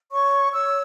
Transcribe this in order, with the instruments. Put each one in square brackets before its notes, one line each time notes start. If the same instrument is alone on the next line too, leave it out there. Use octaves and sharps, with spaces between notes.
[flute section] C#5 C#6
C#5 E6